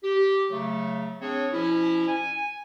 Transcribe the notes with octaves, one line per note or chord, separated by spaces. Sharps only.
G4
C#3 F#3 A3
C4 D4 G#4 C#5
B2 F3 C#4 E4
G#5